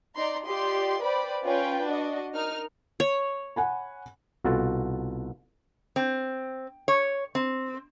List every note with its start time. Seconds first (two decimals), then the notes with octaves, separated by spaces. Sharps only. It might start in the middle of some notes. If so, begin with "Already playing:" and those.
0.15 D#4 D5 A#5 C6
0.45 F4 G4 D5 D#5 C6
1.01 B4 C5 D5 G5 B5
1.46 C#4 F4 B4 G5
1.86 D4 F#4 D#5
2.34 D#4 A#4 F6
3.00 C#5
3.56 F#5 G#5 B5
4.44 C2 B2 F4 F#4 A4 A5
5.96 C4
6.88 C#5
7.35 C4